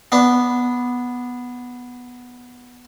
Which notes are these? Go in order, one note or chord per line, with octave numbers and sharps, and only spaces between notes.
B3 D4